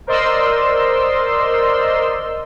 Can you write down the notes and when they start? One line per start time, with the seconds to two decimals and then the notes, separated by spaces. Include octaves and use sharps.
0.07 A#4 C5 D5 D#5 C6 E6